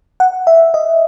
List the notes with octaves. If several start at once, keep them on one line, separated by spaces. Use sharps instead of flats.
F#5
E5
D#5